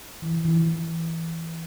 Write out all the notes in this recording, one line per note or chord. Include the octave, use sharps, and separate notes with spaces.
E3
E3
E3